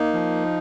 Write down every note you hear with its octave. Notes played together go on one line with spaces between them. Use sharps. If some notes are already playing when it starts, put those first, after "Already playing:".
Already playing: A#3 D#4
F3